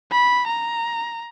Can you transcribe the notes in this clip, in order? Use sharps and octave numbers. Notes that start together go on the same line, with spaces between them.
B5
A#5